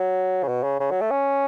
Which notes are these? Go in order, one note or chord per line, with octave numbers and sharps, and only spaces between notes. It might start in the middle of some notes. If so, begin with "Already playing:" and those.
Already playing: F#3
C#3
B2
C#3
C#3
F#3
A3
C#4